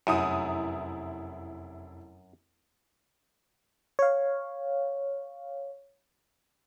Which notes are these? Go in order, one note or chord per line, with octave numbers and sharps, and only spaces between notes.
F1 F#2 E4 D#6
C#5 F5